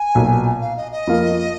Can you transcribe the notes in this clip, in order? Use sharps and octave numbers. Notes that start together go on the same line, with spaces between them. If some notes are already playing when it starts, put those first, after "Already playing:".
Already playing: G#5
B1 A#2 F#3
F5
D#5
D#5
F2 F3 A#3 F4